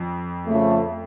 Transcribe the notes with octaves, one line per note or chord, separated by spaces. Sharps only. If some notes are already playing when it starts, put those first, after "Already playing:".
Already playing: F2
C#3 F3 A3